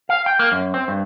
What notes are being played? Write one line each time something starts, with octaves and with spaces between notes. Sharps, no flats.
F5
G5
A#3
F#2
C4
G2